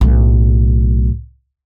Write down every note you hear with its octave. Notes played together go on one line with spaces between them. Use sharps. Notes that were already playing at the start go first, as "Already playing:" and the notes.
B1 A2